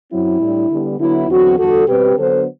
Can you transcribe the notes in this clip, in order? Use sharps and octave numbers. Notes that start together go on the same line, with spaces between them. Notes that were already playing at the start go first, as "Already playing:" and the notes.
F#2 F#3 C4 E4
A2 G3 D4
D3 G3 B3 D4
D3 F#3 B3 E4
E2 D3 F#3 C4 F#4
E2 D3 G3 F#4 A4
B2 G3 C4 G4 B4
D3 F#3 B3 D4 A4 C5